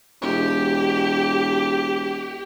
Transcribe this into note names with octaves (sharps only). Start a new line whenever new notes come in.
E1 G4